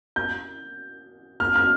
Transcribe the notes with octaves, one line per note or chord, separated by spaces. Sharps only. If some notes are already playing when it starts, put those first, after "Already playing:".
G6
F6
F6